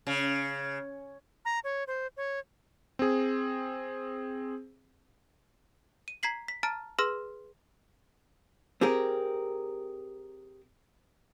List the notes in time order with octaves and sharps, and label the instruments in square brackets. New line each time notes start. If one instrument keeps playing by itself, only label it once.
[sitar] C#3
[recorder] A#5
C#5
C5
C#5
[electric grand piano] C4 G#4
[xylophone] D#7
A#5 G#6 B6 C7 F#7
B6
A5 A#5 F6 A6 D7
G#4 B4 C6 E6 F6 A#6
[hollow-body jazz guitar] C4 G4 G#4 A#4